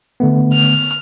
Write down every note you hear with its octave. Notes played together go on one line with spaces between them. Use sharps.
D3 A3 B3
F6